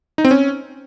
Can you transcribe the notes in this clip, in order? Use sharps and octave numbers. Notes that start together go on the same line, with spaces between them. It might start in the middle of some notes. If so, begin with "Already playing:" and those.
D#4
C4
C#4